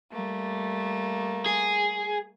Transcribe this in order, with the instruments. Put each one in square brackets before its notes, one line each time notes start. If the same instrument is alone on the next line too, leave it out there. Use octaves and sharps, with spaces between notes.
[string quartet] G3 A3 A#3
[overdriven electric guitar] G#4